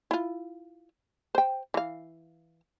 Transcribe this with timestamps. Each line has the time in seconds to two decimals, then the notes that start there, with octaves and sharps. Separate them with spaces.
0.11 E4 F4
1.35 C5 G5
1.74 E3 F5